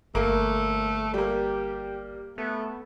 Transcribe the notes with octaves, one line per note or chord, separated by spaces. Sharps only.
G1 A3 A#3
G3 A#3 G4
A3 B3